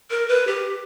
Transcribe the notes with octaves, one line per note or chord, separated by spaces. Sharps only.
A#4
B4
G4